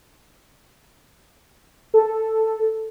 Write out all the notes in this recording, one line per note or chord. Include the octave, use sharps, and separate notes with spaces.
A4